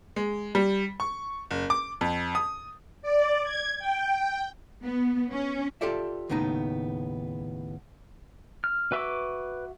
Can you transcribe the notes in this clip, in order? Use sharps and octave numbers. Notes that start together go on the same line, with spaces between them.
G#3
G3
C#6
F#1
D6
F2
D#6
D5
G#6
G5
B3
C#4
F4 G4 A4 D5 E5
D#2 A2 C#3 B3 D#4
F6
F#4 B4 E5 D6